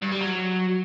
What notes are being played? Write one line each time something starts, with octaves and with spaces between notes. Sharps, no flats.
G2
G3
F#3